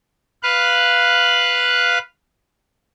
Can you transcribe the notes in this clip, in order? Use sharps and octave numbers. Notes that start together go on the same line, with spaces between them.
B4 F5 F#6